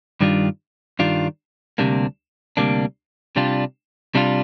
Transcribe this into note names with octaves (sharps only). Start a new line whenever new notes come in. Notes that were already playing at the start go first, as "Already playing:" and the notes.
G2 D#3 G3 D4 F4
G2 D#3 G3 D4 F4
D2 C3 G3 A#3 D4
D2 C3 G3 A#3 D4
C3 G3 D4 F4
C3 G3 D4 F4